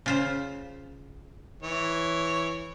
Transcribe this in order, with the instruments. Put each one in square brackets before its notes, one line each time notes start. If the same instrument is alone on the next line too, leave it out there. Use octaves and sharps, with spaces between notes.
[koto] C#3 F4 C5
[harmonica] E3 C#5